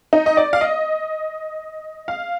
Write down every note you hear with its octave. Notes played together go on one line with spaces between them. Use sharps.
D#4
D#5
D5
F5
D#5
F5